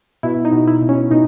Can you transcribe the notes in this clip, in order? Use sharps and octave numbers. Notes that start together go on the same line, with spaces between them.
B2 E4
D#4
B2
E4
B2
C#4
B2 D#4